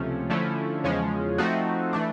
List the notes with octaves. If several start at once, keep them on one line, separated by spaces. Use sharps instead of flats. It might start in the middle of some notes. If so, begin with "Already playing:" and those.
Already playing: C#2 C3 F3 A3 C#4
D3 F3 A3 C#4 E4
E2 C#3 F3 G#3 C#4
F3 A3 C4 D#4 F#4
E3 A3 D4